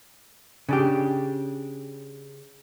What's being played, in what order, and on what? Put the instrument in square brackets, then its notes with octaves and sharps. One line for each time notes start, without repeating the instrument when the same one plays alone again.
[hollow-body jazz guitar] C#3 D4 G4